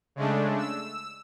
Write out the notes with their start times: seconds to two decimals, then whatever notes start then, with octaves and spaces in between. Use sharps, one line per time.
0.16 C#3 G#3 A3 D4
0.58 E6